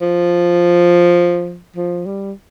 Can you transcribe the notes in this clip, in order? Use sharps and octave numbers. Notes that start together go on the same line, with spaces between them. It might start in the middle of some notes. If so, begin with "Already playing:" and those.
F3
F3
G3